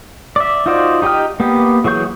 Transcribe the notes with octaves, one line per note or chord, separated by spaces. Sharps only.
D5 E5
D#4 F4 F#4 C5 D5
D#4 G4 D#5 G5 F6
A#3 B3 G4
E3 F#3 G#4 C#6 G6